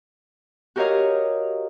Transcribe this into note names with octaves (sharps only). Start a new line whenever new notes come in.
F#4 G4 A#4 C#5 D#5 F5